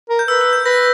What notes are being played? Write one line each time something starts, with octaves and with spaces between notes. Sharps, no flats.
A#4
G6
B4 E6
E6
G6
B4 A#6